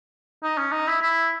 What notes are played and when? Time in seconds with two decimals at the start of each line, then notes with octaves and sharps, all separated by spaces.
0.43 D#4
0.57 C#4
0.72 D#4
0.88 E4
1.02 E4